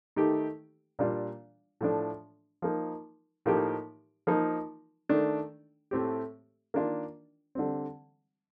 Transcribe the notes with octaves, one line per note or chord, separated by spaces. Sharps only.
D#3 A3 D#4 G4
A#2 G3 D4 F4
A2 F3 A3 D4
F3 A#3 D#4
A2 F3 A#3 D#4 G4
F3 A#3 D#4
D#3 A3 D4
A2 A3 C4 G4
D#3 A#3 D4 F4
D3 G3 C4